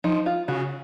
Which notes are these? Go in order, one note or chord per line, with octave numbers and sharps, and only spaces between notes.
F3 D#4
F4
C#3 F#4